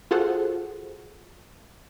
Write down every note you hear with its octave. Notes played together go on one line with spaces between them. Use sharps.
F4 F#4 G#4 A4 C5 F#5